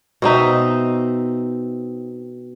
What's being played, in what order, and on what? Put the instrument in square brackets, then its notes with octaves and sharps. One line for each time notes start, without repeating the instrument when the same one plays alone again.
[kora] B2 C4 D#4 E5